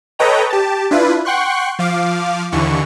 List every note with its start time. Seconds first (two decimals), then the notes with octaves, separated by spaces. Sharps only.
0.19 A4 B4 C#5 D#5 G5 A#5
0.50 G4 A5
0.91 D4 E4 F4 B4
1.25 F#5 G5 C6 C#6 F#6
1.79 F3 F5 D6
2.52 D#2 D3 E3 C#6